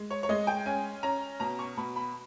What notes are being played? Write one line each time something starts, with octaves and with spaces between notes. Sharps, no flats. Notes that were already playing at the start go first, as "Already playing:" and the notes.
Already playing: G#3
C#5
C#5
G#3 D#5
G5
C#4 G#5
C#4 A#5
B2 A#5
C#6
B2 B5
B5